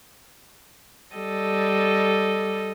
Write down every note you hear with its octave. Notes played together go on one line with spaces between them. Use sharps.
G3 A4 D#5